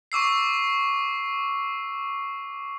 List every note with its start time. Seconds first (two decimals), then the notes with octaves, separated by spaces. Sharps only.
0.12 C#6 D6 E6 C7